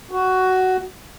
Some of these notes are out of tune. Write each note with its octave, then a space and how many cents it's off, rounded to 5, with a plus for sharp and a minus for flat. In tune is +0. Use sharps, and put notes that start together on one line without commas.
F#4 +10